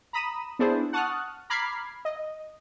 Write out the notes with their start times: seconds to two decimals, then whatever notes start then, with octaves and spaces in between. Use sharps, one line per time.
0.13 A#5 B5 D#6 D#7 E7
0.59 B3 D4 E4 G#4 C5
0.93 F#5 A5 C#6 D#6 F6 F#6
1.50 A#5 B5 D6 F6 G#6 C7
2.05 D#5